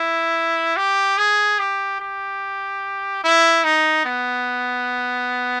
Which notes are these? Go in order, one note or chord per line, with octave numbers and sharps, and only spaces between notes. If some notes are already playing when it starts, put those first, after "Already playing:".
Already playing: E4
G4
G#4
G4
G4
E4
D#4
B3